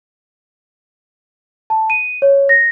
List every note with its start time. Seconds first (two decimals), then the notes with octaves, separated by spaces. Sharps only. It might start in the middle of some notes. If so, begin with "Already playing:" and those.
1.70 A5
1.90 D#7
2.22 C#5
2.49 A#6